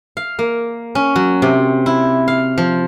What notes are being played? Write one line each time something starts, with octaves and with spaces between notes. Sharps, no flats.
F5
A#3
C#4
F#3
C3
E4
F5
F3